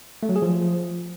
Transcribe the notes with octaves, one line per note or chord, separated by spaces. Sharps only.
A3
F#3
G#4
F3